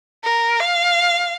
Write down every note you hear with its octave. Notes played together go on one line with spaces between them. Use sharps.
A#4
F5